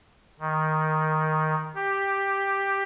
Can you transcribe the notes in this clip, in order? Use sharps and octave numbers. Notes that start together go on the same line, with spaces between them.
D#3
G4